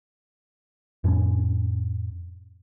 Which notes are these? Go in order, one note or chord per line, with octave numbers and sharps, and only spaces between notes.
F2 A2 C#4 D4